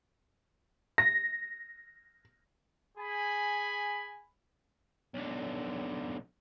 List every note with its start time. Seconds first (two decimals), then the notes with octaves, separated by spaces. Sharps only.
0.98 A#6
2.97 G#4 G#5 B5
5.14 B1 D3